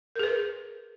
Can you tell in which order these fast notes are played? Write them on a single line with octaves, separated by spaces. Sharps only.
A#4 G#4 B4